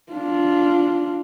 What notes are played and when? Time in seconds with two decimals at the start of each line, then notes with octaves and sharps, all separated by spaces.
0.12 D4 F4